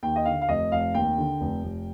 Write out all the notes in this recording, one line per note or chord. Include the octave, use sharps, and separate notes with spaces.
D#2 G5
D#5
D3 F5
F5
F1 D#5
F1 F5
D#2 G5
D3
F1
F1